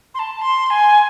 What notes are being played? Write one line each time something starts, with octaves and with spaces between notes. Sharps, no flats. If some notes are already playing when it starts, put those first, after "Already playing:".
C6
A5
C6
G#5